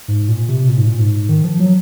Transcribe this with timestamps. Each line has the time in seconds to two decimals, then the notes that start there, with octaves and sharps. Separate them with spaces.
0.08 G#2
0.28 A#2
0.48 C3
0.69 A#2
0.77 G#2
0.86 A#2
0.99 G#2
1.29 D#3
1.44 F3
1.59 F#3